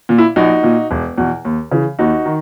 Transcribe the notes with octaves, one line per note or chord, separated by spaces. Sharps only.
A#2
E4
A#1 D#4 F#4
A#2
E1
E2 B2
D#2
C#3 E3
D#2 D#4 F#4
D#3